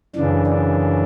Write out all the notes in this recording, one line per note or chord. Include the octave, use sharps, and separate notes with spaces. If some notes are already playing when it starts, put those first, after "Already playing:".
F#2 C#3 E3 D4
D4